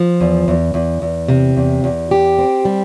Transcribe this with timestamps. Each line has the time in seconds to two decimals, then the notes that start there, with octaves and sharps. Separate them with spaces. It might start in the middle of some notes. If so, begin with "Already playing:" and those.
Already playing: F3
0.21 E2
0.48 E2
0.74 E2
1.02 E2
1.28 C3
1.57 E2
1.84 E2
2.11 G4
2.39 C4
2.65 G3